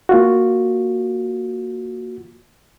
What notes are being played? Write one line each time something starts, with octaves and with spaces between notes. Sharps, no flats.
A#3 F4 F#4